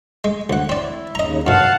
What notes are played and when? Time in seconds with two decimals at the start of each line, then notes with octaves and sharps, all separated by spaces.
0.24 G#3
0.50 D2 F#5
0.69 C4 E4 D5
1.15 D#2 C#3 D#5 A#5
1.47 F#2 B2 F5 F#5 A5